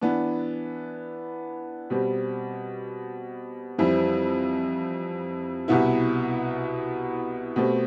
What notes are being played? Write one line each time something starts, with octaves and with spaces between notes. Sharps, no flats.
E3 B3 D4
B2 G3 C4 G4
F2 E3 G3 C4 E4
C2 B2 B3 E4
B2 A3 C4 G4